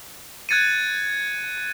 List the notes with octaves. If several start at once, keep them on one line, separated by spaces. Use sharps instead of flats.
F#6 G#6 A6 C#7 D#7